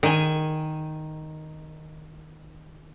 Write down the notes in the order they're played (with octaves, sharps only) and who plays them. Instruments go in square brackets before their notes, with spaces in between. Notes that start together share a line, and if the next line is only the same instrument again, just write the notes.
[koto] D#3 G#5